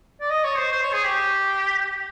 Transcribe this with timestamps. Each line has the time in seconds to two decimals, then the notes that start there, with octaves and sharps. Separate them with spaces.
0.21 D5
0.30 D#5
0.44 C#5
0.57 C5
0.72 C5
0.82 C#5
0.93 G#4
1.04 G4